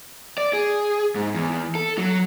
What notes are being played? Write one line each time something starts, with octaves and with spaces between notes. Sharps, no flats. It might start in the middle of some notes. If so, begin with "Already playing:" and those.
D5
G#4
G#2
E2
A4
F#3